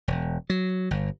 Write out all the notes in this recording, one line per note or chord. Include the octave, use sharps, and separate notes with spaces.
E1
F#3
G1